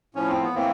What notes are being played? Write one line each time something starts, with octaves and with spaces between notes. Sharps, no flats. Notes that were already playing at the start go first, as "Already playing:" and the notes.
A2 F3 C#4
C4
B3
A2 E3 A#3 C4